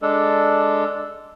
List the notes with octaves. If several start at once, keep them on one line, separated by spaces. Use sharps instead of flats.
G#3 D4 A4